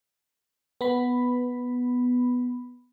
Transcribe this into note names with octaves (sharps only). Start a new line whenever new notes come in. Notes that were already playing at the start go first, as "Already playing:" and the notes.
B3 B5